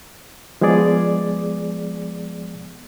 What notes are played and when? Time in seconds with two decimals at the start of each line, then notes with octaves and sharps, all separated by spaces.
0.61 F3 G#3 B3 G#4 D5